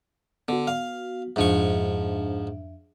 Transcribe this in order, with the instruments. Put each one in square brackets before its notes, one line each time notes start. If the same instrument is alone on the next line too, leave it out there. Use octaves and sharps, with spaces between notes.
[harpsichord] D3 [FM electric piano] B3 F#4
[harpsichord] F5
[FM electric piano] F2 D4 E5 [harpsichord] G#2 F3 C#6